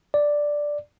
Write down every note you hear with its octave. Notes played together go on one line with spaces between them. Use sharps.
D5